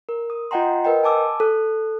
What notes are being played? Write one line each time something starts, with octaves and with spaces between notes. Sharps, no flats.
A#4
D#6
F4 D#5 F#5 G5 A#5 C6
A#4 B4 D#5 G5
G#5 A5 D6 E6
A4 F#6